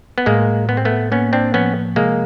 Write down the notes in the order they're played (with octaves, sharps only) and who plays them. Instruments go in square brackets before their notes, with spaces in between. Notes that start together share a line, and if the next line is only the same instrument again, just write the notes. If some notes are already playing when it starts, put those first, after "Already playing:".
[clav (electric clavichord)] B3
[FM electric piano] A2 [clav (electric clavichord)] G#3 A#3
[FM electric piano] A2 [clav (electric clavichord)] B3
[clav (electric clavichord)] C4
A3 B3
[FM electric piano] A#3 [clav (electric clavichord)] B3 C#4
[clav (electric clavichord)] C4 D4
[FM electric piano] F3 [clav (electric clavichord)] B3 C#4
[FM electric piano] C3 [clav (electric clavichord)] G#3 A#3